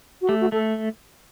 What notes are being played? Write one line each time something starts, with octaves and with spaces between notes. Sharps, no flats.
F#4
A3 G4
F#4
A3 A4